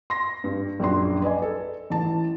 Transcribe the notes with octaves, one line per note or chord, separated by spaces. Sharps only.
C6 A#6
G2
A#1 F#2 D4 C6
B4 D5 D#5 G#5
A4
A1 E3 A5